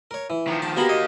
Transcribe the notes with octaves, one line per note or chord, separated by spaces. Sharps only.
A#4 C#5
E3
D#3 F3
A5
A#3 B3 D#4 F#4 G4 A5 B5
D#5